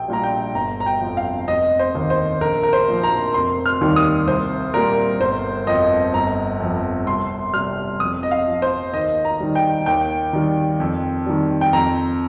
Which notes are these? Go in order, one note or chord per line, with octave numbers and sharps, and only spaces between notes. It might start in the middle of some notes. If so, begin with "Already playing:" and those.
Already playing: A#1 G5
A#2 G3 A#5
G5
G1 A#5
A#5
G5
F2 F3
F5
F1 D#5
C5
D#2 D#3
C5
A#1 A#4
A#4
C5
A#2 F3
A#5
F1 C6
F6
D#2 D#3 G3
D#6
C2 C5
A#2 G3 A#4
G1 C5
F2 F3 D#5
G1 A#5
F2 F3
C2 C6
C3 G3 F6
F2 D#6
D#5
F5
F3
C5
D#2 D#5
A#5
D#3 G3
G5
D#2 G5
D#3 G3
F2
D#3 G3
G5
F2 A#5